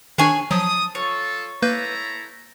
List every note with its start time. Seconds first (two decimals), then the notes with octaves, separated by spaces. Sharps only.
0.18 D#3 D4 G#4 C#5 G#5
0.51 F3 F#3 A5 D#6
0.95 F4 A4 C#5
1.62 A#3 E4 A4 B4 A#5 G6